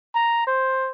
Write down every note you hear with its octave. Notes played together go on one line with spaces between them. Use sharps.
A#5
C5